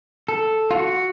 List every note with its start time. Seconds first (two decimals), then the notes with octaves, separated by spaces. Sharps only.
0.28 A4
0.71 F4
0.76 F#4